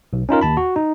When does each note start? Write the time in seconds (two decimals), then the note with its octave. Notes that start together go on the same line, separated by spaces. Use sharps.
0.13 B1
0.29 C#4 D#4 F4 A#4
0.41 D#2 A5 B5
0.57 F#4
0.76 D#4